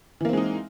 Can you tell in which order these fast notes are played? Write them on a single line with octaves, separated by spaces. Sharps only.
E3 A#3 C4 G#3 D#4